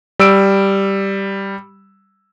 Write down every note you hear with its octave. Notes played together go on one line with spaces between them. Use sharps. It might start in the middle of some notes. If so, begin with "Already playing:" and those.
G3 E6 D7